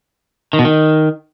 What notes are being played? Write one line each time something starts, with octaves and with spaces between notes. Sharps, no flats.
D#3
B2
D#3